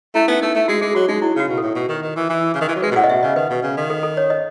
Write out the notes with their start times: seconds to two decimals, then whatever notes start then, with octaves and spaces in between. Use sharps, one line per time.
0.15 A3 E4
0.28 B3 D#4
0.41 A3 D#4
0.55 A3
0.68 G#3 F#4
0.81 G#3 G#4
0.95 F#3 F#4
1.08 G#3 D#4
1.22 F#3 E4
1.36 C#3 F#4
1.48 B2
1.58 A4
1.63 A2
1.75 B2
1.89 D#3
2.02 D#3
2.16 E3
2.29 E3
2.54 C#3
2.61 D#3
2.68 E3
2.76 F#3
2.82 G#3 B4
2.92 B2
2.95 A2 F#5
3.04 D#5
3.09 B2 E5
3.23 C#3 D#5
3.36 D#3 B4
3.50 B2
3.63 C#3
3.77 D#3
3.90 A4
4.03 A4
4.17 C#5
4.30 D#5